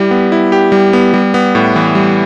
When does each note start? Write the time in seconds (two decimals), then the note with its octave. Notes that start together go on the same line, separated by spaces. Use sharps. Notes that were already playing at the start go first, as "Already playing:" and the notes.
Already playing: G3 E4 G4
0.11 B3
0.32 E4
0.52 G4
0.72 G3
0.93 B3
1.14 G3
1.34 B3
1.55 A2
1.76 E3
1.95 G3